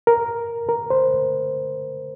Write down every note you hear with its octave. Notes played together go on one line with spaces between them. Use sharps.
A#4
A#4
C5